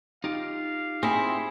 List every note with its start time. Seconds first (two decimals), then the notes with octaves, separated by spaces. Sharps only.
0.24 D#4 F4 G4 F5
1.03 C4 E4 G#4